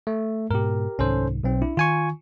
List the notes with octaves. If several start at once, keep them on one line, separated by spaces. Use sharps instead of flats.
A3
G#2 B2 G4 A#4
C2 G#2 D#3 C#4 A4 C5
B1 C4
D4 E4
D#3 F4 G#5 C#6